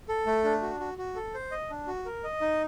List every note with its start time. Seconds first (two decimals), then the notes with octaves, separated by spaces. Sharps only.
0.09 A4
0.26 A3
0.44 D4
0.62 F#4
0.80 F#4
0.98 F#4
1.15 A4
1.34 C5
1.51 D#5
1.70 D4
1.88 F#4
2.06 A#4
2.24 D#5
2.41 D#4